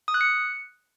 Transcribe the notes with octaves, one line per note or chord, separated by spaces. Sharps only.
D#6
F#6
C#7